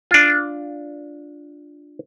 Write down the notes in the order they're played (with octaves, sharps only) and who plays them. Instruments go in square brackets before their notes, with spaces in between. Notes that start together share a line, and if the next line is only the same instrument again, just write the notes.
[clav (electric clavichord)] D4 F4